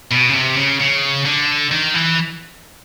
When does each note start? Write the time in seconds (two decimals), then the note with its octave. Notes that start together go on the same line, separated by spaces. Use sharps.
0.12 B2
0.30 C#3
0.35 C3
0.57 C#3
0.80 C#3
1.26 D3
1.71 D#3
1.94 E3